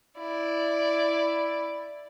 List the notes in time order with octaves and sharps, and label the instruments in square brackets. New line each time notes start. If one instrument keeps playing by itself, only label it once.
[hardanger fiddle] E4 D5